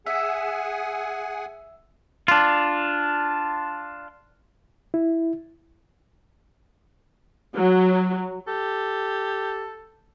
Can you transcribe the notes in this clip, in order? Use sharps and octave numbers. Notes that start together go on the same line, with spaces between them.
G#4 E5 F#5 G#5
D4 F4
E4
F#3
G4 A4